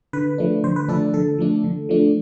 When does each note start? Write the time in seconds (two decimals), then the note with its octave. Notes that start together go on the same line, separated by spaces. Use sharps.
0.13 D3 B4
0.38 F3 A3 D4
0.64 D3 C5
0.76 B4
0.89 F3 A3 D4 A4
1.14 D3 A4
1.38 F3 A3 D4
1.64 D3
1.89 F3 A3 D4